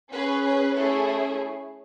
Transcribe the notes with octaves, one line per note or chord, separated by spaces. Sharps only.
C#4 G#4 B4
B4
A3 C#4 E4 G#4 A4